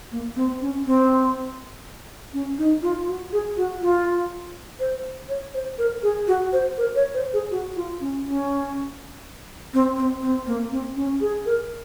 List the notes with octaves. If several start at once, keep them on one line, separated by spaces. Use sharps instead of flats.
A#3
C4
C#4
C4
C#4
D#4
F4
F#4
G#4
F#4
F4
C5
C#5
C5
A#4
G#4
F#4
C5
A#4
C#5
C5
G#4
F#4
F4
C#4
C#4
C4
C4
C4
A#3
C4
C#4
G#4
A#4